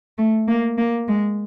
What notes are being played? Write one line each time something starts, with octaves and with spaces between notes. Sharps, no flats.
A3
A#3
A#3
G#3